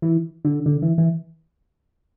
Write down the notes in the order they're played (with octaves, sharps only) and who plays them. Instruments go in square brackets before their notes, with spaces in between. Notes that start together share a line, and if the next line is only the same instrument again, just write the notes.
[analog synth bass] E3
D3
D3
E3
E3